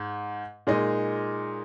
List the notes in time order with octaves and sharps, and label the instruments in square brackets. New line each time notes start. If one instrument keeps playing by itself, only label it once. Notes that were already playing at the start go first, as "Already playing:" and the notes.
Already playing: [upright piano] G#2
A#2 G#3 D#4